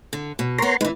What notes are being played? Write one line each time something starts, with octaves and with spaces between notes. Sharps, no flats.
D3
B2
B3 A#4 C#5 A#5 C6
E3 G#3 D#4 B4